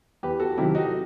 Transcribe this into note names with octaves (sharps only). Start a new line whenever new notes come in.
E2 G4 B4
F#4 A4
C3 D#3 F#3 E4 G4
D#4 F#4